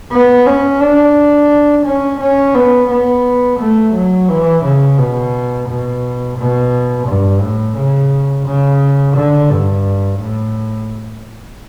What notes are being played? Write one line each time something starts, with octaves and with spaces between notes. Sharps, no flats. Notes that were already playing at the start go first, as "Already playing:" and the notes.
B3
C#4
D4
C#4
C#4
B3
B3
A3
F#3
E3
C#3
B2
B2
B2
G2
A2
C#3
C#3
D3
G2
A2